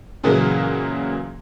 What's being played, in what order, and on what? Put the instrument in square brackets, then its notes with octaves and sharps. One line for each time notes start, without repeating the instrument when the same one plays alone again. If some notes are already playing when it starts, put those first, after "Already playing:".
[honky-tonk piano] A#2 C#3 E3 F#3 G#3 A#3